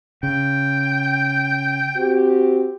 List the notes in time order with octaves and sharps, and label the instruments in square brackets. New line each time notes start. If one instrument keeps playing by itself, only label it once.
[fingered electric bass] C#3 [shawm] G5
[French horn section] C4 F#4 G4